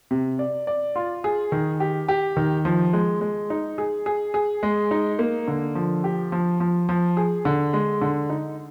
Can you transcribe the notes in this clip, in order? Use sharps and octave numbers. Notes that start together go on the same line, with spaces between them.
C3
D5
D5
F4
G#4
D#3
G4
G4
D#3
F3
G#3
G#3
D#4
G#4
G#4
G#4
G#3
D#4
A#3
D3
F3
G4
F3
F3
F3
G#4
D3
G#3
D3
D#4